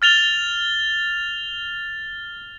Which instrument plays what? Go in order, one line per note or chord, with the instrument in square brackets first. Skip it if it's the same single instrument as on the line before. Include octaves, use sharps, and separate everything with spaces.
[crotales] F6 A6 F7 G7